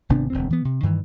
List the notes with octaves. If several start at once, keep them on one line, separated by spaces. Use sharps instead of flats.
G#1 C3 B3 D4
E1 D2 C4
E3 B3
C3
G2 D#3 E3